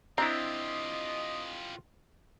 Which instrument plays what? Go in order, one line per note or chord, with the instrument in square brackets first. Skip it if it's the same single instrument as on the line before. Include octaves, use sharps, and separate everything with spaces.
[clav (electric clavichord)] C4 D4 E4 [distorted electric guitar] F4 G4 [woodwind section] D#5 [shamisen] A#5